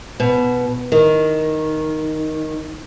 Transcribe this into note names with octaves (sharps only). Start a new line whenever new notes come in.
B2
D#3